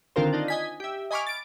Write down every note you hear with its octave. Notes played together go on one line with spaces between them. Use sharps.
D3 D#3 C4 F4 A#4 C5
D4 D#4 F4
D#5 G#5 B6
G4 E5
D#5 G#5 B5 C#6 D6 F6
A6 D7